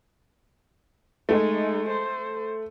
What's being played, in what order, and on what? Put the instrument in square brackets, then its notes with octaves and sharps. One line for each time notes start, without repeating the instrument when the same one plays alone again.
[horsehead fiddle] G#3 D#4 [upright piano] A3
[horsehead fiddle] C5